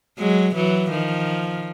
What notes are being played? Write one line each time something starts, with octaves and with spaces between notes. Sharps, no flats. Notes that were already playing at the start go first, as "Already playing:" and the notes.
F#3 G#3
E3 F#3
D#3 F3